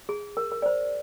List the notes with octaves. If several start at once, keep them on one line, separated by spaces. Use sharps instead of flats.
G#4
A#4
A#4
D5
C5